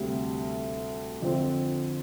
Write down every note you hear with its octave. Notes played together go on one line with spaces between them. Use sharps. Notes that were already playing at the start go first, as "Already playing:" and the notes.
Already playing: D2 C3 G3
F2 D3 F3 C4